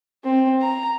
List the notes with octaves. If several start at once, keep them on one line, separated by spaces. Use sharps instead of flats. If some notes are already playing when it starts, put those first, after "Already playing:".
C4
A#5